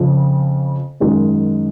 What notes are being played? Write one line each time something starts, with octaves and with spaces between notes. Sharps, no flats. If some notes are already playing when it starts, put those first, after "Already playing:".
Already playing: F2 C#3 F3
F#2 D#3 G#3